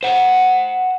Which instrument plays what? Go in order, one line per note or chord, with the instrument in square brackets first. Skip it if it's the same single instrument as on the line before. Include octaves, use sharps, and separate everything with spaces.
[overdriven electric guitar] C5 F#5